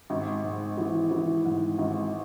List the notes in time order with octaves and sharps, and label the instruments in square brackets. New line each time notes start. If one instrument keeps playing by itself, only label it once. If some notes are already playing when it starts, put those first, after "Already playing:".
[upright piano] G#1
G#2
E3
E3
G#2
G#1